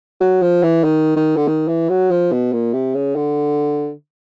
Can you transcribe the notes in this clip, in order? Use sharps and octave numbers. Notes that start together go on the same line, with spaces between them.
F#3
F3
E3
D#3
D#3
D3
D#3
E3
F#3
F3
B2
A#2
C3
C#3
D3